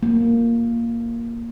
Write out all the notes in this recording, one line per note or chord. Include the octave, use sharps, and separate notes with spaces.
A#3